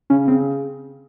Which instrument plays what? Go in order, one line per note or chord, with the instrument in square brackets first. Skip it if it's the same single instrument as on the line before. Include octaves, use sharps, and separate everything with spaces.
[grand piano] C#3 [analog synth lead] C#4
[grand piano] C#3 [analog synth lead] C4